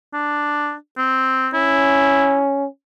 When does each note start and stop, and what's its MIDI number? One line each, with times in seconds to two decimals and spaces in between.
0.13 0.74 62
0.98 1.48 60
1.54 2.66 61
1.54 2.40 64